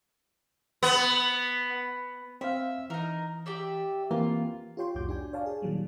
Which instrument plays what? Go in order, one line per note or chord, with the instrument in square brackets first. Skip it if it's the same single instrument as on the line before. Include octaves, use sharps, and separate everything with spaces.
[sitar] B3
[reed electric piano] C4 C5 F5 [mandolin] E5
[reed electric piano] E3 [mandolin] D#4 A#4
[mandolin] G4 D5 E5
[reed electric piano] E3 A#3 C4 [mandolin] F4
[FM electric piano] F4 G4 C#5 G5 C6
C2 F2 A2 F#4 D6 G6
D4 G4 G#5
C#5 D5 F5 G#5 A5
G#4
A#2 D#3 F#3 G3